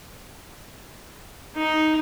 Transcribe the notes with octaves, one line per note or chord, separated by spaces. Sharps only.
D#4